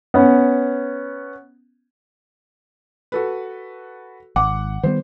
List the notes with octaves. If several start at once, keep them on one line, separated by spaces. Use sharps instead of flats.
B3 C#4
F#4 A4 B4
G#1 F#5 D6
D#3 G3 B3 C5